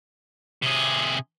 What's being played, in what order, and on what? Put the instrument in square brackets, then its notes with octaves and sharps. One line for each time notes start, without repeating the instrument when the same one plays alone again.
[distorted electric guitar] C3 G#4